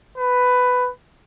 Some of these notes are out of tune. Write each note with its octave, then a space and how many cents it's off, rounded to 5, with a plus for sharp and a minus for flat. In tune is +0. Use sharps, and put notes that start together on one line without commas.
B4 +10